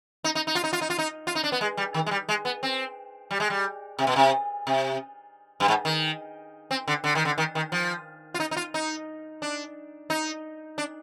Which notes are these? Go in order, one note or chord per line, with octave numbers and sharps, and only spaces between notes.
D#4
D#4
D#4
F4
D#4
F4
D#4
F4
D#4
F4
D#4
D4
B3
G#3
G3
D#3
G#3
G3
G#3
B3
C4
G3
G#3
G3
C3
B2
C3
C3
G2
G#2
D#3
C4
D3
D3
D#3
D3
D#3
D#3
F3
F4
D#4
D#4
F4
D#4
D4
D#4
D4